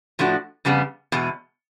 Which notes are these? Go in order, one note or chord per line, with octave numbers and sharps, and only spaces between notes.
A2 F3 A3 D4 F#4
F2 C#3 G3 B3
E2 B2 G#3